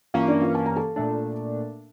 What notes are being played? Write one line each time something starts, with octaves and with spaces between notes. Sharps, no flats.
G2 E3 A#3 C#4 F4 F5
D4 D5
F4 F5
A5
A#5
A4 A5
A#2 A3 D4